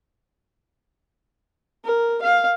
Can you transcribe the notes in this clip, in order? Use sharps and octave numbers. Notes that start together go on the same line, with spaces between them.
A#4
F5